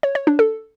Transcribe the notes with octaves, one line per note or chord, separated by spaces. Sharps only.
C#5
C#5
D4
A4